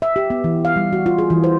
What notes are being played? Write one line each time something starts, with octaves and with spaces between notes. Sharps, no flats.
E5
G4
B3
E3
F5
G3
F#4
F4
G#4
E3
C5